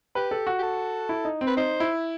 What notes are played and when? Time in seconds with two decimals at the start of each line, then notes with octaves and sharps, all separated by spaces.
0.15 G4 B4
0.31 A4
0.47 F#4
0.59 G4
0.62 A4
1.09 E4
1.25 D#4
1.41 C4
1.47 B4
1.57 D#4 C5
1.80 E4